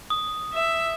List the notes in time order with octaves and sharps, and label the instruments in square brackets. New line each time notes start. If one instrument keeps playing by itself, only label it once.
[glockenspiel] D#6
[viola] E5